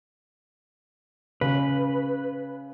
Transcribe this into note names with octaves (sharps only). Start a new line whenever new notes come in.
C#3 B4